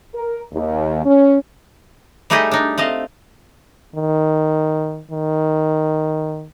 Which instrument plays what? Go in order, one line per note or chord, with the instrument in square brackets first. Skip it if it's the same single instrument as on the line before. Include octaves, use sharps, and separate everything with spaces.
[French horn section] A#4
D#2
C#4
[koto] G3 A3 D#4 G4 G#4 D#5
D4 D#4
A3 C4 D#5 F5
[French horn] D#3
D#3